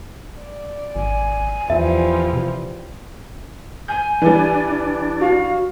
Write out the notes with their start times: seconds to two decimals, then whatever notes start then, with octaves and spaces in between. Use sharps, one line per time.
0.40 D5
0.96 G#1 G#5
1.70 E2 E3 F3 G3 E5
2.33 C3
3.88 G#5 G6
4.22 E3 G3 D4
5.21 F#4 F5